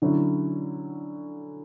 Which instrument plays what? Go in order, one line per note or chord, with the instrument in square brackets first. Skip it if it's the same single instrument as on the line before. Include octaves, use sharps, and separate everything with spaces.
[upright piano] D3 F#3 C#4 E4